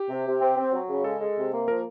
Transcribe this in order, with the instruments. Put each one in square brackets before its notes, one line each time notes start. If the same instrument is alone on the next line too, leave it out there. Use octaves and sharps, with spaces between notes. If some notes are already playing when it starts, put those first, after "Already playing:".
Already playing: [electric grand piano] G4
[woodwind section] C3
C3
C4
C4
F#3
C#3
[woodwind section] G#3 [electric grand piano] A4
[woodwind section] G#3
C3
A#3
[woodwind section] F3 [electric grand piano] A#4